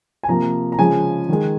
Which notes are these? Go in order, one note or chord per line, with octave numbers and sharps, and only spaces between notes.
G#5
C3 F3 A#3 A#5
A#5
C#3 F3 G#3 G#5
D#3 G#3